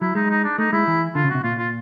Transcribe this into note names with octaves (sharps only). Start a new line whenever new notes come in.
F#3 E4
G#3 D#4
D#4
D4
A3 D#4
G#3 E4
E3
D3 F4
C#3
C3 F#4
A#2 F4
F4